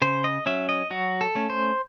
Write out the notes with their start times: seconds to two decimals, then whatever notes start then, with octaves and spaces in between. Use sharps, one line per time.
0.02 C#3 C5
0.24 D#5
0.46 F#3 C#4 E5
0.69 D#5
0.90 F#3 F#4
1.21 A4
1.35 A3 C#4
1.50 C5